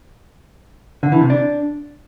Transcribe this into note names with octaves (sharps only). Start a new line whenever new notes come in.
D3
E3
C3
D4